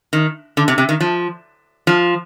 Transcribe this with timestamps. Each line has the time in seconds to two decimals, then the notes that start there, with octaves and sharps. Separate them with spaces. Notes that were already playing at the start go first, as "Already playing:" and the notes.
0.13 D#3
0.57 D3
0.68 C3
0.78 C3
0.89 D#3
1.00 F3
1.87 F3